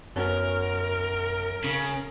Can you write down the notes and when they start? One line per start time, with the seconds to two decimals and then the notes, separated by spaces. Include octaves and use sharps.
0.16 F#2 F#3 B3 C#4 A#4
1.64 C#3